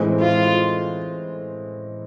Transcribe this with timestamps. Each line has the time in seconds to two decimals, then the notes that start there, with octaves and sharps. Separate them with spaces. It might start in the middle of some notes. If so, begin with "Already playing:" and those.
Already playing: A2 E3 G#3 C4
0.21 F4